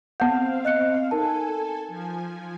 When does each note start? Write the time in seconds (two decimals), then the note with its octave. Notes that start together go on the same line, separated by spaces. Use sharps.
0.20 B3 C4 F5 F#5 G6
0.65 D#5 F#6 C#7
1.11 D#4 A4 A#4 G#5 A5
1.88 F3 G#5